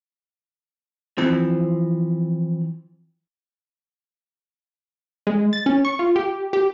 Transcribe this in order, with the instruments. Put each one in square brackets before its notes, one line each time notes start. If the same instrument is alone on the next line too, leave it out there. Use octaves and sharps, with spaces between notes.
[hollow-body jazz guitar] E3 F3 C4
[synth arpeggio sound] G#3
A6
C#4
C#6
F4
G4
G4